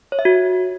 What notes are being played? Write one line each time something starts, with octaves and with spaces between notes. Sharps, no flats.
C#5
E5
F#4